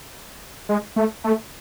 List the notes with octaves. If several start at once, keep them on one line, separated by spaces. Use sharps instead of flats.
G#3
A3
A3